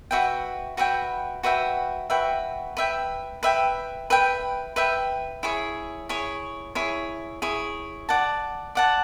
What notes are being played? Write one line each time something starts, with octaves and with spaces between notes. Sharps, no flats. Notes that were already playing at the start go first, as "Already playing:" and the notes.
F#4 B4 E5 G5
F#4 B4 E5 G5
F#4 B4 E5 G5
F#4 B4 E5 G5
B4 E5 G5
B4 E5 G5
B4 E5 G5
B4 E5 G5
E4 G#4 C#5
E4 G#4 C#5
E4 G#4 C#5
E4 G#4 C#5
D5 F#5 A5
D5 F#5 A5